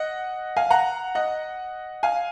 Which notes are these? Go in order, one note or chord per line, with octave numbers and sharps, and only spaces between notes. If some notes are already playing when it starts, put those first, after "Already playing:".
Already playing: D#5 F#5
F5 G#5
F#5 A#5
D#5 F#5
F5 G#5